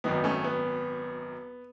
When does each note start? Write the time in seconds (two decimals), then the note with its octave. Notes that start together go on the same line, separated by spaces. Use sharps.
0.04 G#1 F#2 D#3 B3 D#4
0.24 A3 C#4
0.44 B3